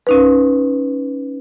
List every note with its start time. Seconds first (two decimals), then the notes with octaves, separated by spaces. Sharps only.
0.07 C#4 D#4 B4